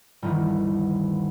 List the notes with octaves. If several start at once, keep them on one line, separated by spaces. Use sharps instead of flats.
G1 D2 D#3 E3